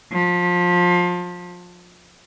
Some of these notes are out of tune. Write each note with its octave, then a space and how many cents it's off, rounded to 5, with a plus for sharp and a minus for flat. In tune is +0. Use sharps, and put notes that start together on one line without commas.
F3 +25